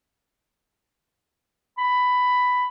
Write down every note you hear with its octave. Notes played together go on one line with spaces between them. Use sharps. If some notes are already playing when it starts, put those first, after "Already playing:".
B5